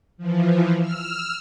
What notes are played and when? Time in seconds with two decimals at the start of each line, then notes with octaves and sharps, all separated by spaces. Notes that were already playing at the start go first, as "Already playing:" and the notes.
0.18 E3 F3
0.79 E6 F6